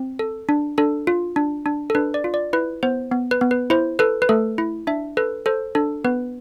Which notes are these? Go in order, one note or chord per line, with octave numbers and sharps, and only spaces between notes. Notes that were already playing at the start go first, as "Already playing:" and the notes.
Already playing: C4
A4
D4
D4 A4
F4
D4
D4
A4
D4 B4
D5
F4
D5
E4 B4
B3 C5
B3
B4
B3
B4
E4 C5
A4 B4
B4
A3 A4
E4
D4 E5
A4 B4
A4 C5
D4 A4
B3 B4